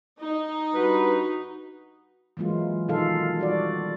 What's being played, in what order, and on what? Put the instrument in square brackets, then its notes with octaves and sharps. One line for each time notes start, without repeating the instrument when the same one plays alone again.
[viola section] D#4
[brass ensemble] G2 B4 [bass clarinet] F#4
[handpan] E3 F#3 G#3 A#3 F4
B2 D#3 D#4 F4 A4 F5
G3 F#4 D5